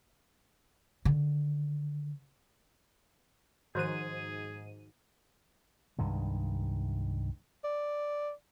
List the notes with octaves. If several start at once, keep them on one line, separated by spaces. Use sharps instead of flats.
D3 D#3
G#2 D#3 F3 F#4 G#4 C5 D#7
C2 G2 D#3 G#3
D5